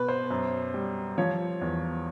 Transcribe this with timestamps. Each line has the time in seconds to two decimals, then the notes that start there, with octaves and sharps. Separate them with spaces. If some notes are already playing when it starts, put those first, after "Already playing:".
Already playing: B2 B3 B4
0.08 C5
0.30 F#2
0.74 G3
1.18 F3 C#5
1.61 E2